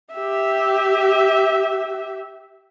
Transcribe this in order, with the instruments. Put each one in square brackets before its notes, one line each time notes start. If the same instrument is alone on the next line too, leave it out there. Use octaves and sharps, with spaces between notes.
[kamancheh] G4 E5